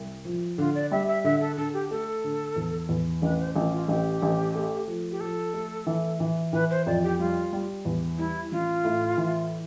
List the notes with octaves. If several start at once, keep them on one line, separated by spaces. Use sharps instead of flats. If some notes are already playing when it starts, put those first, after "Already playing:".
Already playing: C2
F3
D3 F4
D5
G3 E5
E5
D3 E5
A4
D3 A4
G4
A3 A4
D3
E2
E2
A1 B4
C5
A1 F4
F4
A1 G4
A1
A3
F3
G4
F3 A4
A3
E3
E3
E3 B4
C5
F2 D5
G4
G3 F4
G3
E2
G3 E4
A1 F4
A2
E3